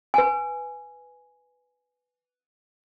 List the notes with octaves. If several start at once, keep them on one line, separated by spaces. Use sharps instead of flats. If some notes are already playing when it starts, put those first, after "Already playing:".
B4 G#5